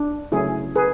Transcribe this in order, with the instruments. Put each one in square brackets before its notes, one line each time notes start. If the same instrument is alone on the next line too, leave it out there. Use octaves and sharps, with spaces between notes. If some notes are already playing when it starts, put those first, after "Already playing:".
Already playing: [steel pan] D4
C#3 F#3 A3 C#4 E4 G#4
G#4 B4